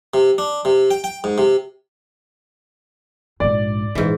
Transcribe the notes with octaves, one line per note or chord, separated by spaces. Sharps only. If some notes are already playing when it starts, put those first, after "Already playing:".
C3
D4
C3
G5
G5
G#2
C3
A#1 G#2 D5
A#1 G#2 E3